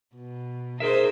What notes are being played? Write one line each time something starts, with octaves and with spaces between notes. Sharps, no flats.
B2
D#4 G#4 A#4 C5 E5